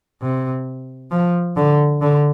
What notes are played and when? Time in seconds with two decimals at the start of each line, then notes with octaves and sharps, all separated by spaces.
0.22 C3
1.11 F3
1.57 D3
2.01 D3